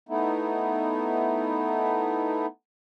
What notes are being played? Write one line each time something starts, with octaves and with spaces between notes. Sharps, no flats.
A3 B3 D#4 E4